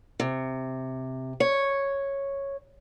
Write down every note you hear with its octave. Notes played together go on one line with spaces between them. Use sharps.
C3
C#5